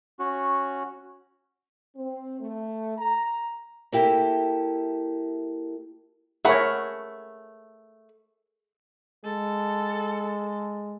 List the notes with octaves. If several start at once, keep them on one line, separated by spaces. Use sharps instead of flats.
C#4 F#4
C4
A3
A#5
A#3 E4 G4 A4
A3 G#4 A#4 C#5 F#5 B5
G#3 A4